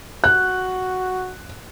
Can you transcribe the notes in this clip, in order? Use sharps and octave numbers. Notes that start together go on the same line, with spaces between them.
F#4 F#6